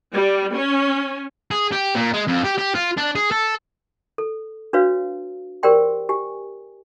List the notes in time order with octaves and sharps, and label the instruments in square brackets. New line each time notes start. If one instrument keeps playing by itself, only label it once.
[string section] G3
C#4
[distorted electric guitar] G#4
G4
A#2
G#3
F2
G4
G4
F4
D4
G#4
A4
[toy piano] A4
D4 F#4 B4 C#5 F5
G4 A#4 C5 D5 G5 C6
G4 G#5